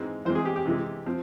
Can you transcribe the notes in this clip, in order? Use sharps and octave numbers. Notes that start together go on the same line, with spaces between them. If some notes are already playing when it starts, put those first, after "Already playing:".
Already playing: G#2 E3 G#3 C4
E2 E3 G#3 C4 C5
G#4
G4
G4
C3 E3 G#3
F3 C4